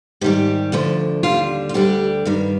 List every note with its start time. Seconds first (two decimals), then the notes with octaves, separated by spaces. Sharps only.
0.21 G#2 D#3 G3 G4
0.72 D2 D3 F3
1.23 D#2 D3 G3 F4
1.69 F4
1.74 D2 D3 G3 G4
2.25 G2 D#3 G3